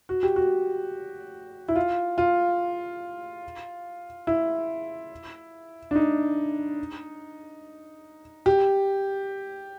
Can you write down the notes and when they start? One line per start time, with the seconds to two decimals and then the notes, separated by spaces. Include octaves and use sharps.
0.09 F#4
0.23 G4
0.36 F#4
1.68 E4
1.76 F4
2.18 F4
4.27 E4
5.91 D4
5.95 D#4
8.46 G4